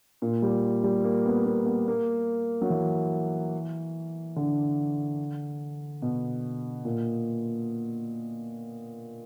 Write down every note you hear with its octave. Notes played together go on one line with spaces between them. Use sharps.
A#2
G3
G3
A#3
B3
A#3
B3
A#3
F#3
E3
D3
B2
A#2